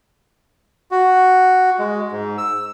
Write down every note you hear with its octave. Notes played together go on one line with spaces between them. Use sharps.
F#4
G#3
G#2
E6